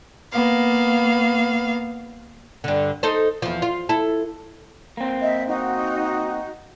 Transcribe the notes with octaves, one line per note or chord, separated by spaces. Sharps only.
A#3 B3 F5
G2 D3
D#4 A4 C5
E2 F3
F4
E4 A4
A#3 C4
D#5 E5
D#4 F#4